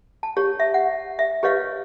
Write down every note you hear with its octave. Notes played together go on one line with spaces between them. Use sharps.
A5
G4 C#5
E5
F#5
E5
G4 B4 C#5 D#5 F5